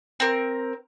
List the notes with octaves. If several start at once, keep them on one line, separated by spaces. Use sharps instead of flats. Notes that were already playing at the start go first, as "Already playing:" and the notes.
C4 A#4